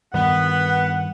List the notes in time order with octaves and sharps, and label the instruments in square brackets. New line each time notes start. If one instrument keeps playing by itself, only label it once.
[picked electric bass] G2 D#3 [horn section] B3 [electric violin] F#5